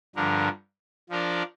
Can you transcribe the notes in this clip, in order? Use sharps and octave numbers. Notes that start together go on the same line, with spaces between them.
G2 D3 F3 D4 A#4
F3 D4 F4 A#4 D5